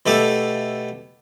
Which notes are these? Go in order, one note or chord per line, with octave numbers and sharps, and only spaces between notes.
B2 A3 G4 A4 E5